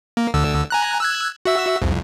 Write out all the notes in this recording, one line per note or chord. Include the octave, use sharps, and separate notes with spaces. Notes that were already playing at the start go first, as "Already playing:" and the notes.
A#3
D2 D3 E6
G#5 A#5 F#6
E6 F#6 G#6
F#4 E5 E6
C2 F2